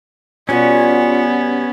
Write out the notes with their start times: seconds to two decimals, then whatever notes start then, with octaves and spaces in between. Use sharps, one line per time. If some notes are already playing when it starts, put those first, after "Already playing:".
0.49 B2 G3 B3 C#4 F4 F#5